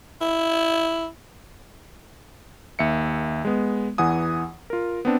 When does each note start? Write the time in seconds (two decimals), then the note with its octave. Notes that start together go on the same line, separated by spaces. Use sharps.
0.22 E4
2.79 D#2 E5 C#7
3.45 G#3 B3
3.98 E2 E3 F#5 G#5 D#6
4.70 F4 A#4
5.05 B3 C4 D4